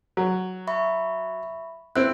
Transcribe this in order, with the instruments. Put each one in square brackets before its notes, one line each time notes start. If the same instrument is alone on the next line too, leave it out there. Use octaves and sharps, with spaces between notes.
[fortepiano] F#3
[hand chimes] E5 B5 C#6
[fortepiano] C4 E4 [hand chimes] F#6